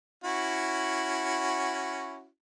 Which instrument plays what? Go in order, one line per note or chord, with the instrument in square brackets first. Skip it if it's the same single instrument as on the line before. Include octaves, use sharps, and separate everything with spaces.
[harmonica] C#4 E4 F#4